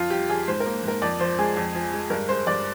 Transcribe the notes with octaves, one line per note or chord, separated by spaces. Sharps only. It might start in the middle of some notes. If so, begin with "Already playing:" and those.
Already playing: F2 F4
G3 G4
F2 G#4
G#2 C5
A#4
A#3
G#2 A#4
F2 D5
F3 C5
G#3 G#4
F2
F3
G#3
G2 A#4
G#3 C5
G2 D5